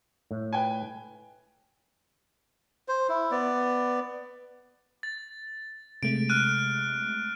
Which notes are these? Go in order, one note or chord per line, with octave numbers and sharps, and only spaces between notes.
A2
B4 G5 G#5
C5
E4
B3 D5
A6
C3 G#3 A3 D7
F6 F#6 D#7